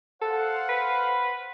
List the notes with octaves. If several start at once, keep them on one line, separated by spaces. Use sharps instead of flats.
A4 C5 F5 F#5
B4